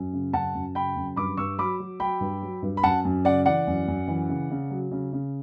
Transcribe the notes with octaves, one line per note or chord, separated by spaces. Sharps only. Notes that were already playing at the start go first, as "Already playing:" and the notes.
Already playing: F#2
C#3
F#2 F#5 A5
F#2
C#3 G5 B5
F#2
G2 B5 D6
G2 C#6 E6
F#3 B5 D6
F#3
F#3 G5 B5
G2
F#3
G2
B5
F#2 F#5 A5
F#2
C#3 D5 F#5
E3 D5 F#5
F#2
F#2
E3
C#3
C#3
F#3
C#3
C#3